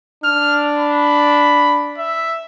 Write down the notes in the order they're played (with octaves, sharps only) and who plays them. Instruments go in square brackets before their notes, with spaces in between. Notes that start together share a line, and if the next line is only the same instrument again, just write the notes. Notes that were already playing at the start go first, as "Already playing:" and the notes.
[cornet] D4 [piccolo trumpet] F6
[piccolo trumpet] B5
E5